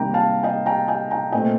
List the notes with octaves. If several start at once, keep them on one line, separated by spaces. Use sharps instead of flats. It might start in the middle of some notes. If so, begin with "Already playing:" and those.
Already playing: C3 D#3 G3 A#3 G5 A#5
F5 A5
D#5 G5
G5 A#5
D#5 G5
G5 A#5
A#2 A3 C4 D#5 G5